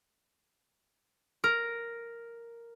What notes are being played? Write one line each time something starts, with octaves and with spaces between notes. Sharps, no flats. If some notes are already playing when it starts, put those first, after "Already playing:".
A#4